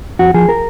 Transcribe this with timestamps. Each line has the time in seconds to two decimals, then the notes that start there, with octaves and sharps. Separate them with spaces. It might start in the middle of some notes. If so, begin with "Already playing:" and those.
0.19 F2 F#4
0.34 F3 G#4
0.49 A#4